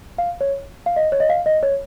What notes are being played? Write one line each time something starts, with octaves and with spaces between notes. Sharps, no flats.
F5
C#5
F5
D#5
C#5
D#5
F5
D#5
C#5